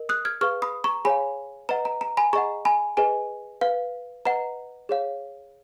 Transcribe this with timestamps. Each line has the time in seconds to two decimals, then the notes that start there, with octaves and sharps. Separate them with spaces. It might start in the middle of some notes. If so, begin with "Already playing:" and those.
Already playing: A#4 D#5
0.09 D#6 F#6
0.25 F6 G#6
0.41 G#4 B4 F5 C#6 F6
0.62 B5 D#6
0.84 A#5 C#6
1.05 G#4 C#5 F5 G#5 B5
1.69 B4 D#5 F#5 A#5
1.85 A#5
2.01 A#5
2.17 G#5 B5
2.33 G#4 D#5 F#5 A#5 C#6
2.65 G#5 B5
2.97 G#4 B4 D#5 G#5
3.61 B4 F5
4.25 B4 D#5 F#5 A#5
4.89 G#4 C#5 F5